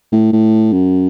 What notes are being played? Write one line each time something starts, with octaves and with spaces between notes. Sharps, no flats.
A2
A2
F#2